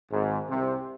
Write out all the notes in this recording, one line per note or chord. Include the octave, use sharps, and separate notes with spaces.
G#1 G#2
C2 C3